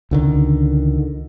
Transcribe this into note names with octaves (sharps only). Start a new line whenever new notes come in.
C#2 D3 D#3